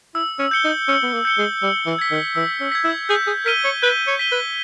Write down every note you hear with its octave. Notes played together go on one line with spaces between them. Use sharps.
E4 E6
C#4
G6 C#7 G7
D#4
C#4 E6
B3
A#3
G6 C#7 G7
G#3
G3 E6
E3
G#6 B6
D#3
E3 E6
C#4
G#6 B6
E4
G#4 G6
G#4
A#4 B6 D#7 G7
C#5
B4 G6
C#5
B6 D#7 G7
B4